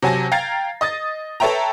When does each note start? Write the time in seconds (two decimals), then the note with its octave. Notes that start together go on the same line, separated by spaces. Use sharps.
0.02 C3 F#3 G#5 A5 A#6
0.32 F5 G5 A#5 G#6 A6 C7
0.81 D#5 D#6 A6
1.40 A4 B4 C#5 E5 G5 A#5